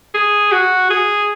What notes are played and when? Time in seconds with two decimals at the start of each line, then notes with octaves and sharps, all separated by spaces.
0.14 G#4
0.52 F#4
0.90 G#4